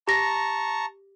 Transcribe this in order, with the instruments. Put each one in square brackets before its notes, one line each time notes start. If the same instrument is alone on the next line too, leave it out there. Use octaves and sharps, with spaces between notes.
[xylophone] G4 A#6 [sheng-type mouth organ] A5 A#5 C#6